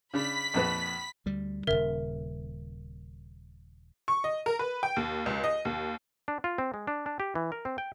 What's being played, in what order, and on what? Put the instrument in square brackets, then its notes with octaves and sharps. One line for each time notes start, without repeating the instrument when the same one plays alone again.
[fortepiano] C#3 D4 [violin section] B5 B6
[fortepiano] A#1 F2 B4
[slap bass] D2 G3
[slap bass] D#1 A#1 C#3 [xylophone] A#4 E5
[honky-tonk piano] C#6
D#5
A#4
B4
G5
D#2
C#2
D#5
D#2
[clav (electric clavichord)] D4
F4
C4
G#3
D4
D4
G4
E3
A#4
C4
G5